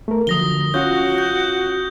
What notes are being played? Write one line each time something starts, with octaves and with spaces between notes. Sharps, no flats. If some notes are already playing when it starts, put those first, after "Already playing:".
A3 A#4
D3 F3 F#3 D#6 A#6 G7
C#4 F4 F#4 C#5 G6
G6